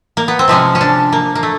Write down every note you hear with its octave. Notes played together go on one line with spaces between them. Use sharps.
A#3
B3
C4
C3 F3 G#3 C#4
C#4
D4
A#3
A#3
A3